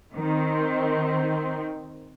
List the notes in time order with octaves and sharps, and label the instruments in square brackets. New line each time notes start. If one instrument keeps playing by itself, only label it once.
[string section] D#3 C4